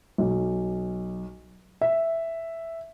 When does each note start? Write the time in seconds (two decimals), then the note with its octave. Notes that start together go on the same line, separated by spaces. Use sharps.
0.18 B1
1.81 E5